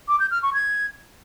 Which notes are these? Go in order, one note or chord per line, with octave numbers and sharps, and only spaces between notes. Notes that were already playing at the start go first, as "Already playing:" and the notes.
D6
G6
F6
C#6
G#6